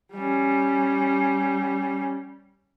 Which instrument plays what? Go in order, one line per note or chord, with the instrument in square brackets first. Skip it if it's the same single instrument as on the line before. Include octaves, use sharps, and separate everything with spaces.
[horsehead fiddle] G3 C#4